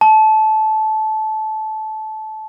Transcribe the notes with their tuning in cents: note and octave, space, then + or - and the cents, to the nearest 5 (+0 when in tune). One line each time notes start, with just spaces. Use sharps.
A5 -20